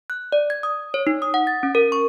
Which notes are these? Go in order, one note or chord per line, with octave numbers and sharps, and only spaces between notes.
F#6
D5
G#6
D#6
C#5
D#4
D#6
F#5
A6
C#4
A#4
C#6